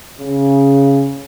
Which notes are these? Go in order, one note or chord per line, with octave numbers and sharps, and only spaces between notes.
C#3